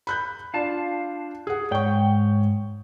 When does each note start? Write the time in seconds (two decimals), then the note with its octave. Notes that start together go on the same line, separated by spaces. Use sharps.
0.07 B5 F#6 G6
0.54 D4 F4 F5 A5
1.47 G#4 F#5
1.71 G#2 C#5 G5 C#6